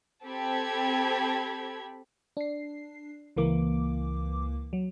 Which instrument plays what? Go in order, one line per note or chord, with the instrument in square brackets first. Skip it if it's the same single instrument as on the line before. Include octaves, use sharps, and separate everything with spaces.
[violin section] C4 G4 A4 B5 G#6
[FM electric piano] D4 C7
C#2 E3 A#3 D6
F#3